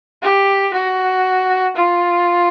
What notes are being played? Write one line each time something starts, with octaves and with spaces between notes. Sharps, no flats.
G4
F#4
F4